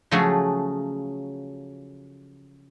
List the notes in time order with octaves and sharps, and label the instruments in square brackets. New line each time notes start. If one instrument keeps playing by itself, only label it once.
[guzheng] C#3 F3 F#3 A3 F#4 G#4